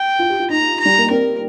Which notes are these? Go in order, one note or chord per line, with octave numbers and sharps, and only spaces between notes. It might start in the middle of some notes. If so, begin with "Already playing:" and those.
Already playing: G5
F4
G4
F4
D#4 A#5
A#5
G3
A#3
C4 A#4